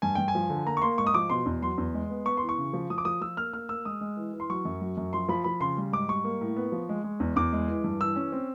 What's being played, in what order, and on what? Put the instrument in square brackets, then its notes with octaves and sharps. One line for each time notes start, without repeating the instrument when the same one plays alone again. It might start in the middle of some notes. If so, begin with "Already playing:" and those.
[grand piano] G2 G#5
G2 G5
G#5
F3
D3
A#3 A#5
C#6
A#3 C6
G#2 C#6
D#6
F3 D6
B2 C6
E2
F#3 C6
E2
G#3
B3
B3 C#6
E3 C6
C#6
C#3
F3
F3 D#6
D6
F3 D#6
F3 E6
A#3 F6
A#3 F6
A#3 E6
G#3 D#6
G#3
E3
E3
C6
F#3 C#6
F#2
F#3
F#2
F3 C6
F3 B5
F3 B5
C#3 C6
G3
G#2 D6
G3 C#6
A#3
A2
B3
F3
G#3
G#3
E2
E2 D6
G#3
E3
G2
E3 E6
C#4
C4